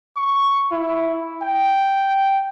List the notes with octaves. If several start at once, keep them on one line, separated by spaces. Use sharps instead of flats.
C#6
E4
G5